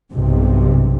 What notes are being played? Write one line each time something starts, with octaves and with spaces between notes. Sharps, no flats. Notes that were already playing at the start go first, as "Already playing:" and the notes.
B1 G2 C3